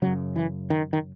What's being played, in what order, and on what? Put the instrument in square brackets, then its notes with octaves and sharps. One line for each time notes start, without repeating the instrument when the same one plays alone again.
[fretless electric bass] F#2 C#3 F#3
E3
D#3
D#3